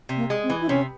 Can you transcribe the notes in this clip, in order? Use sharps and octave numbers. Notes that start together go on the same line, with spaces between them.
C3
A#3
G#3
C4
E3
E4
C3 C#4